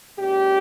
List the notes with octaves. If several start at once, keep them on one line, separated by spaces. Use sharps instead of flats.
A#2 G#3 C#4 G4